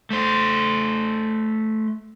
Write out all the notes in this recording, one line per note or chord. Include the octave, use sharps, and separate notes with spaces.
A3 C5